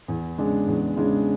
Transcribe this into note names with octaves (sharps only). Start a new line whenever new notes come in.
E2
C#3 G#3 D4
E2
C#3 G#3 D4